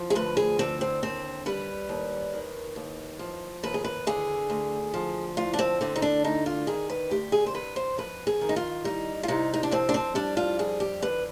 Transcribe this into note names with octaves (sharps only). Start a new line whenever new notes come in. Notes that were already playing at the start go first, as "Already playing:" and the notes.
Already playing: F3
G#4
D2 B4
G#4
D3 C4
C4
D#2 C4
G3 B4
D#2
D#3
D#2
F3
D#2 B4
G#4
B4
D3 G#4
D2
F3
D2 F4
D4
C4
D3 C4
D#4
D4
D2 D#4
F4
D#3 G#4
B4
D2 G4
G#4
C5
C3 B4
C5
F2 B4
G#4
D#3
D#4
F4
G3 D#4
F4
C3 D#4
D#4
D4
F2 C4
D4
C4
G3 D4
F4
F2 G#4
G4
D3 B4